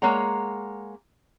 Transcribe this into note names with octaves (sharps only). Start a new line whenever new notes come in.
G#3 A#3 C#5 F#5 A#5